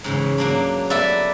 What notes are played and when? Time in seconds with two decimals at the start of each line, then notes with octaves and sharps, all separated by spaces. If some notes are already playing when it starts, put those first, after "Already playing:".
0.04 G#2 C#3 E3
0.38 F#3 A#3 D4
0.90 B3 A4 B4 D5 E5